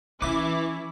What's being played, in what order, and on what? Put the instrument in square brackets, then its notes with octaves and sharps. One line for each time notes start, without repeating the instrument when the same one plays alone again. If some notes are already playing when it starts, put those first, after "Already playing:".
[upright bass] E3 [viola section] C#4 E4 [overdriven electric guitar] B4 E5 [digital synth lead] D6